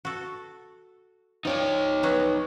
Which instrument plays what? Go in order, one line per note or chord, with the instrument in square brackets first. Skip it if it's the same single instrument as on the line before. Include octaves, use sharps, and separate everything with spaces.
[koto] F#4 A4
[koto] F3 D5 G#5 [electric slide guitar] D#4 C#5
[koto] F#3 B3 F#4